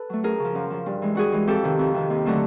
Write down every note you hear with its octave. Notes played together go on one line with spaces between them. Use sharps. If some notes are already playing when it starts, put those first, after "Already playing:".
Already playing: A4 B4
F#3 A3
F#2 G#4 A#4
C#3 F3
F#2
C#3 F3
G2
E3 G#3
G2 F#4 G#4
E3 G#3
F2 G4 A4
C3 D#3
F2
C3 D#3
D#2
D3 F#3 A3 C4